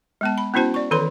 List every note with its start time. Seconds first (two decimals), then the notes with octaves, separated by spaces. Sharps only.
0.21 G#3 B3 A5
0.38 B5
0.54 B3 C#4 E4 F#4 C5 A5
0.74 D5 C#6
0.91 D#3 E3 A4 B4 C#5 C6